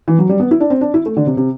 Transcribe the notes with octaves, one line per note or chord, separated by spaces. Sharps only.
E3
F#3
G3
B3
E4
D4
C4
D4
E4
A3
D3
C3
C3